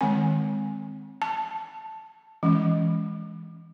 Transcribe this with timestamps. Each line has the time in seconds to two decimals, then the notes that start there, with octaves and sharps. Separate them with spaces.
0.01 D#3 G#3 C4 G#5
1.22 A5
2.43 E3 G#3 C#4